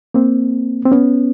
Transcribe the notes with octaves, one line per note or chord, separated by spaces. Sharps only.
A#3 C4
C4
B3 C#4